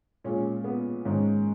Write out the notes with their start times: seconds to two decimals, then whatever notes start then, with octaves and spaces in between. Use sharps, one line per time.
0.24 A#2 G#3 C#4
0.64 B3
1.05 G#2 D#3 G#3 C#4